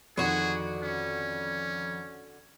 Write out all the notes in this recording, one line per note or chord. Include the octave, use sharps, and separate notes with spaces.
F2 D3 D#3 F#4 G#4
C#4